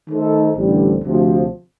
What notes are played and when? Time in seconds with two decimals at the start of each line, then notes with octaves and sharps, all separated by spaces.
0.09 D#3 A3 D#4 A4 C5
0.56 A1 G2 D3 G3 C4
1.04 D2 C3 F3